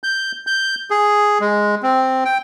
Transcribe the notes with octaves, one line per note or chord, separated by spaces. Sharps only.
G6
G6
G#4
G#3
C4
G5